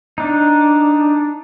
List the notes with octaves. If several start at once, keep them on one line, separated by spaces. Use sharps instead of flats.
D4 D#4